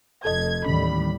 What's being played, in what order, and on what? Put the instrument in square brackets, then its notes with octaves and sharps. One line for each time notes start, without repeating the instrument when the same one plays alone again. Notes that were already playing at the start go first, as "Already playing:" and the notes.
[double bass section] F1 [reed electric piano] A4 D#5 [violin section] G#6
[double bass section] D#2 A2 G3 [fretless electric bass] D#3 E3 C#4 [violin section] B5